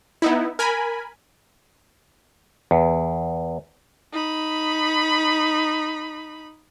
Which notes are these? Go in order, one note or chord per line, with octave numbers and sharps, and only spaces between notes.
B3 D#4 E4
A#4 G#5 B5
E2
D#4 B5